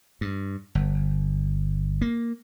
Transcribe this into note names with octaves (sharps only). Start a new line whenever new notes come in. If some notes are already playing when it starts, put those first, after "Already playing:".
G2
G1
A#3